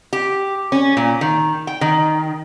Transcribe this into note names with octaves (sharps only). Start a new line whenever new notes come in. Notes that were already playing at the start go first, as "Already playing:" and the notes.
G4
C#4
A#2
D#3
G5
D#3